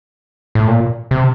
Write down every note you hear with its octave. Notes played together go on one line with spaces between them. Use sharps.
A2
A#2
C3